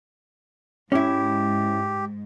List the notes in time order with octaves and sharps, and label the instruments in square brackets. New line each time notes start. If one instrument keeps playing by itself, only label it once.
[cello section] G#2 [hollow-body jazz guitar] C#4 E4 [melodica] G4